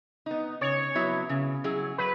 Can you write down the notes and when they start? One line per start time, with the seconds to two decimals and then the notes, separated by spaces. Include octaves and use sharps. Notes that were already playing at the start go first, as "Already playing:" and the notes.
0.26 B3 D#4
0.61 C#3 C#5
0.95 F#3 B3 E4
1.29 C#3
1.64 F#3 C#4 E4 G#4
1.98 F#3 B4